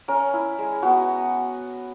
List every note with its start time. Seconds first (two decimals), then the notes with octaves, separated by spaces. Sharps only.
0.08 C#4 A#4
0.34 E4
0.59 G#3
0.83 B3 F#4